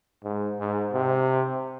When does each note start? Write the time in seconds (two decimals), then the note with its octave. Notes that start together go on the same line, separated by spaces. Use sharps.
0.24 G#2
0.60 G#2
0.93 C3